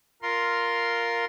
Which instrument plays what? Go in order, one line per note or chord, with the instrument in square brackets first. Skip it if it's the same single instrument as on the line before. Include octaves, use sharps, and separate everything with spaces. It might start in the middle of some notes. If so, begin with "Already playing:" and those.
[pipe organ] F4 A#4 C6